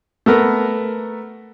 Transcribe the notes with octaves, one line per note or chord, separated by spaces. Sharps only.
A3 B3 A#4